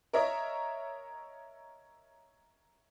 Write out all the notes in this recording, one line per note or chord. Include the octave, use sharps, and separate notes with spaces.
A#4 C#5 D#5 E5